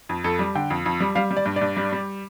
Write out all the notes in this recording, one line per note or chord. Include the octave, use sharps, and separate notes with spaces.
F2
F2 A4
G3
D3 G5
F2
F2
G3
G3 F5
G3
D5
G2
D5
G2
G3
G3